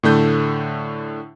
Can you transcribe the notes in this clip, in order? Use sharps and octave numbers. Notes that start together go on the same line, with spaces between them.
A2 D3 A3 G6